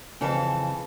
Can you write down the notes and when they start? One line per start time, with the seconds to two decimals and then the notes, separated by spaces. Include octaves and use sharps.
0.21 F2 C#3 E3 A4